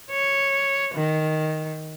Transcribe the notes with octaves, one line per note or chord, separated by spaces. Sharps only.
C#5
D#3